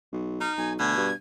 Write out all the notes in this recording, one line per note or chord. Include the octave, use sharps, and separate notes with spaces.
B1
D#4 F6
B1 G#5
D2 B2 G#6
G2